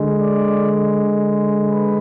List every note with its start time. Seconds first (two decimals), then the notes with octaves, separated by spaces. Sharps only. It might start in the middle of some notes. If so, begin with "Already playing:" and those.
Already playing: D3 G#3
0.18 D5
1.64 B4